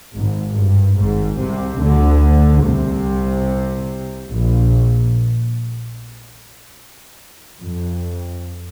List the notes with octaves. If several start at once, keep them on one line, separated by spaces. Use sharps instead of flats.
G#1 G#2
G2
G#1 G#2
C2 C3
D2 D3
C2 C3
A#1 A#2
F2